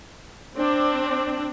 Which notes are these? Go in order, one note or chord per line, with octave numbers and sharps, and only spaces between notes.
C4 D4